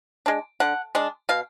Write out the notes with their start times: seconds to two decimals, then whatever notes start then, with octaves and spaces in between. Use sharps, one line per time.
0.26 G#3 D4
0.60 D3 F#5
0.95 G#3 D4
1.29 B2 F5